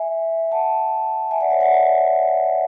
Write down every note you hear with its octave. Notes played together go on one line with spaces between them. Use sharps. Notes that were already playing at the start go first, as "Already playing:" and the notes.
Already playing: E5 G#5
F#5 A5
E5 G#5
D5 F#5
C#5 E5
D5 F#5